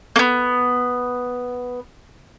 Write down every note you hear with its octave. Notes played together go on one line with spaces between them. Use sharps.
A#3 B3